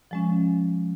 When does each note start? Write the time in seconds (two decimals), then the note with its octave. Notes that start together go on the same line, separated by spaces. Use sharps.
0.11 F3 G#3 C#4